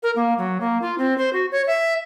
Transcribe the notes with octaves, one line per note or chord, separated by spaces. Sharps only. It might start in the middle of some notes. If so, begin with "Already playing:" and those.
A#4
A#3
F#3
A#3
F4
C4
C5
F#4
C#5
E5